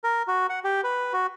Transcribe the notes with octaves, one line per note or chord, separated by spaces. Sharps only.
A#4
F#4
F#5
G4
B4
F#4